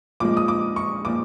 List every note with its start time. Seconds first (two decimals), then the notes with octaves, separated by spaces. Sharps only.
0.20 A#2 F3 G#3 D6
0.37 D#6
0.48 D6
0.76 C#6
1.05 A#2 F3 D6